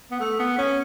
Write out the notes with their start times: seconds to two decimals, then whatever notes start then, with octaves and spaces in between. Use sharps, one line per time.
0.11 B3
0.20 A3
0.39 B3
0.58 C#4